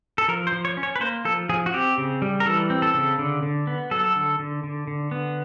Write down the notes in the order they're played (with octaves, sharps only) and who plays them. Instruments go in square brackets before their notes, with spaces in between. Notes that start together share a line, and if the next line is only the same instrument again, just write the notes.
[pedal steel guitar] A4
F3 A#4
C5
F3
C#5
C#4
C#5
B4
A#3 C5
F3 A4
F3 G#4
F#4
C4 G4
C#3
G3
A#4
E3 A4
C4
A4
C#3
D3
D3
B3
F#3 A4
D3
D3
D3
D3
B3